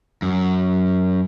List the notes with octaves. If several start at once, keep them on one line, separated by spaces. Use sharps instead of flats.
F#2